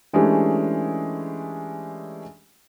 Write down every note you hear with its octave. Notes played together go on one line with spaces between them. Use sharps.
E3 G#3 A3 C#4 D4 G4